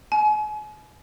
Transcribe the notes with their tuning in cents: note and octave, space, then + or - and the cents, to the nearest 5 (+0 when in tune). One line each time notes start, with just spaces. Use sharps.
G#5 +40